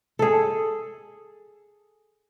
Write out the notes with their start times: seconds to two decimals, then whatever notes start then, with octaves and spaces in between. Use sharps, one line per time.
0.19 G#4 A4